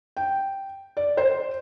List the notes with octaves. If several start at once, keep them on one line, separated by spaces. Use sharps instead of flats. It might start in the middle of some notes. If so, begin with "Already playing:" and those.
G5
D5
C5